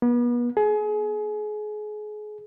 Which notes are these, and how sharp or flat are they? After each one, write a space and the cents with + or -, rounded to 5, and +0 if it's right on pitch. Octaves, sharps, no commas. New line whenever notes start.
B3 -35
G#4 +30